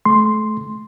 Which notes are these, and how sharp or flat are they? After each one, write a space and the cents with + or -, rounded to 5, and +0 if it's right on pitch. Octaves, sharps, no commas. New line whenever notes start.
A3 -30 C6 +0